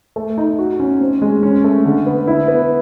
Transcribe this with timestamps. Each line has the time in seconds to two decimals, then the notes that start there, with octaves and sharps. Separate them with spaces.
0.16 A3
0.38 D#4
0.59 F#4
0.80 C#4
1.01 C4
1.22 G#3
1.43 C#4
1.64 A3
1.85 D3
2.06 B3
2.28 E4
2.48 B3